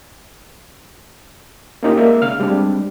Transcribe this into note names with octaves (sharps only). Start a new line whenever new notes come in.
A#3 C#4 D#4 F4 G4
G#3 A#3 D5 E5
C#3 F5 F6
G3 G#3 C4 D4 G4